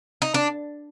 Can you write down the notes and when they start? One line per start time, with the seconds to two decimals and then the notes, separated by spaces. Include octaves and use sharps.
0.22 D#4
0.34 D4